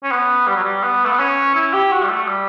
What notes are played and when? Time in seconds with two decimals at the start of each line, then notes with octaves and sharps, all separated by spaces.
0.03 C#4
0.11 B3
0.47 G3
0.55 F#3
0.63 G3
0.83 B3
1.04 A3
1.11 B3
1.19 C#4
1.55 E4
1.73 G4
1.92 F#4
2.02 G3
2.09 A3
2.28 G3